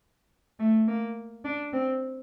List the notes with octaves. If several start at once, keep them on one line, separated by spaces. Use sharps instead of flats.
A3
A#3
D4
C4